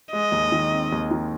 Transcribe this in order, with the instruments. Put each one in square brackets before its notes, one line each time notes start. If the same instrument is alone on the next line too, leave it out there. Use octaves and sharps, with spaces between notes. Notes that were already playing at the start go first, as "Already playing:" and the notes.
[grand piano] G#3 [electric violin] D#5
[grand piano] D#2
D#3
C4
D#2
D#3